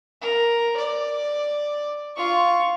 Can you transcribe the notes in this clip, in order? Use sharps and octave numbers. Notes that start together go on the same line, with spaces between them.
A#4
D5
F4 C#6